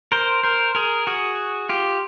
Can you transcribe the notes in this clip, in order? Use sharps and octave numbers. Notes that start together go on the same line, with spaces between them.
A#4 C5
A#4 C5
G#4 A#4
F#4 G#4
F4 G4